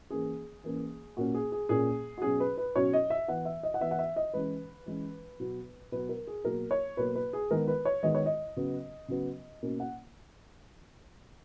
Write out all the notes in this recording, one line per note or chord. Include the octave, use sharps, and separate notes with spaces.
E3 A#3 C#4 G#4
E3 A#3 C#4
A#2 A#3 C#4 F#4
G#4
G#4
A#2 A#3 C#4 G#4
F#4
B2 F#3 C#4 G#4
B4
B4
B2 F#3 C#4 C#5
D#5
E5
E3 B3 F#5
E5
D#5
F#5
E3 B3 E5
F#5
E5
D#5
E3 G#3 C#4 B4
E3 G#3 C#4
B2 F#3 B3
B2 F#3 B3 B4
A#4
G#4
B2 F#3 A#3 A#4
C#5
B2 F#3 A#3 B4
B4
G#4
D#3 G#3 B3 A#4
B4
C#5
D#3 G#3 B3 D#5
C#5
D#5
C#3 F#3 B3
C#3 F#3 B3
B2 A#3 C#4
F#5